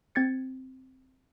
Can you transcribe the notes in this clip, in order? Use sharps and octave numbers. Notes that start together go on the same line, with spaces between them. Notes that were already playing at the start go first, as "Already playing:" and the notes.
C4 G#6 A6 C#7